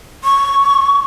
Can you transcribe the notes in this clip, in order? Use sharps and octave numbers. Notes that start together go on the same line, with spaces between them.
C#6